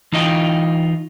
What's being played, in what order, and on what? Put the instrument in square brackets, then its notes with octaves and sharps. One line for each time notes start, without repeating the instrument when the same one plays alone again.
[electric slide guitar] E3 D#4 F4 D#5 G5